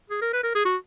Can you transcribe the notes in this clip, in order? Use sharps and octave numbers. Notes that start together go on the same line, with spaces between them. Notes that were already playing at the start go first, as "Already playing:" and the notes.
G#4
A#4
B4
A#4
G#4
F#4